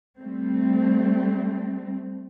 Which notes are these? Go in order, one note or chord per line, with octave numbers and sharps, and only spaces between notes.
G3 A3 C4